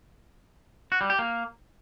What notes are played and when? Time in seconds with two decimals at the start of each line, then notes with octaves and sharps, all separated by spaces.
0.92 F#4
1.01 G3
1.10 G4
1.19 A#3